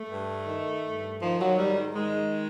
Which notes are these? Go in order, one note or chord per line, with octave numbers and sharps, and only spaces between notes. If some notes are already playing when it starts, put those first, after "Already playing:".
Already playing: A3
G2
D#3
G2
D#3 F3
F#3
G#2 G3
D#3 G#3